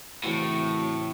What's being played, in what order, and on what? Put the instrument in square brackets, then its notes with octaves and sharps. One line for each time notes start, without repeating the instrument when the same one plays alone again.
[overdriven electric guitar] A2 [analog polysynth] C#3 E3 C4 F#4 C#5